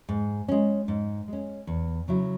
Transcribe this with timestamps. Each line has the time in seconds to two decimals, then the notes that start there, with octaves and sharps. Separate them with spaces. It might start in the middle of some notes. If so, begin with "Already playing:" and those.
0.09 G#2
0.48 G#3 C#4
0.88 G#2
1.28 G#3 C#4
1.67 E2
2.08 C#3 F#3 E4